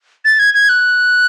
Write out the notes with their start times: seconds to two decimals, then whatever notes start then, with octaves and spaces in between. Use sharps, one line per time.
0.25 A6
0.39 G#6
0.54 G#6
0.69 F#6